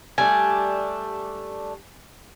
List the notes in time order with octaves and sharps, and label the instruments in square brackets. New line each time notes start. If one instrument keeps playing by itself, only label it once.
[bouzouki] G3 A3 D4 [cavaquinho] G#5